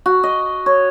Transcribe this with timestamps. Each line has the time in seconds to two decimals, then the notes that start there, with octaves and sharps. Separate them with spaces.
0.06 F#4
0.23 D#5
0.66 C#5